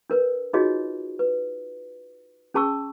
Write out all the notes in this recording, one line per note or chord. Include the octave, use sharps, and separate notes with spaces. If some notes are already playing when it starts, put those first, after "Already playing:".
D4 A#4 B4
D#4 F4 F#4 G#4 C#5 D#5
B4
C#4 G#4 A5 C#6 E6